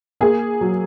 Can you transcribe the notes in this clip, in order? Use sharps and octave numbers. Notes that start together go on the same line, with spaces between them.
A#3 G#4
F#3